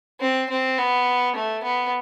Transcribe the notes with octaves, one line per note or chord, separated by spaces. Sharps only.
C4
C4
B3
A3
B3